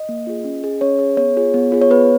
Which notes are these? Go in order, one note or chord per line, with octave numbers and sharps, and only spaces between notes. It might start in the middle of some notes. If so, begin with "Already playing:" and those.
Already playing: D#5
A#3
F4 G#4
C#4
G#4
C#4 C#5
G#4
B3 C#5
F4 G#4
B3
F4 G#4
C#5
B3 B4